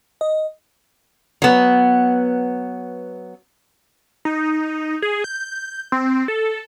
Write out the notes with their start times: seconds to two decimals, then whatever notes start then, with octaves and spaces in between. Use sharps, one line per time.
0.21 D#5
1.42 F#3 B3
4.25 D#4
5.02 G#4
5.24 G6
5.92 C4
6.28 A4